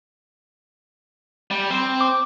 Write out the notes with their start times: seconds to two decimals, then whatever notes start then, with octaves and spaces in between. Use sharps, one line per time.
1.51 G3
1.70 C4 C5
2.01 D6